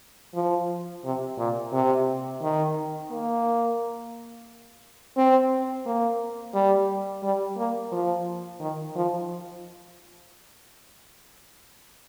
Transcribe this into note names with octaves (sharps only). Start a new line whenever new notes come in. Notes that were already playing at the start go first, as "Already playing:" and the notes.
F3
C3
A#2
C3
D#3
A#3
C4
A#3
G3
G3
A#3
F3
D#3
F3